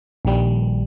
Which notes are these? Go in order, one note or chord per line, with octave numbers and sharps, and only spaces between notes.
A#1 D#3 G3